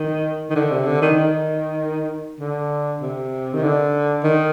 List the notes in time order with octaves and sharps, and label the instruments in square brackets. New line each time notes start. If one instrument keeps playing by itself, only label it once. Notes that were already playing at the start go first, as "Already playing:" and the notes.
Already playing: [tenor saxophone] D#3
D#3
D3
C3
D3
D#3
D#3
D3
C3
D#3
D3
D#3